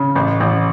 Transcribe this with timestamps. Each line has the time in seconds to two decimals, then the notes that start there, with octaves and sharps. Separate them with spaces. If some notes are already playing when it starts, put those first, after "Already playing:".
Already playing: C#3
0.15 A1
0.40 A1